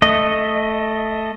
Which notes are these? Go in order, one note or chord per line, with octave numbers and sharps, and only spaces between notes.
A3 D#5